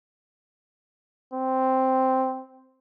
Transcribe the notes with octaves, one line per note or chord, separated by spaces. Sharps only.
C4